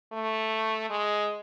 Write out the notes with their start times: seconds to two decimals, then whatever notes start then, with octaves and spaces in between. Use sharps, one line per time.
0.12 A3
0.90 G#3